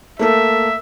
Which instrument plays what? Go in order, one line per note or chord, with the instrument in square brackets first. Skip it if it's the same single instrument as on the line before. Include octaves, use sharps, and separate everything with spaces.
[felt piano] A3 A#3 A4 [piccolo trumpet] E5